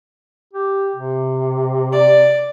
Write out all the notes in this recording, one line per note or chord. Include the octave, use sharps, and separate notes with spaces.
G4
C3
D5